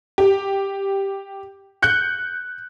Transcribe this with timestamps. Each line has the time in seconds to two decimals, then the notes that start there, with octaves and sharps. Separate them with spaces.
0.18 G4
1.82 F#6 G6 C#7